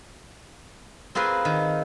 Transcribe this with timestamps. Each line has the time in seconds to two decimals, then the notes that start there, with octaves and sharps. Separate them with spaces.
1.15 C4 F4 G#4 A#4 B4
1.45 D#3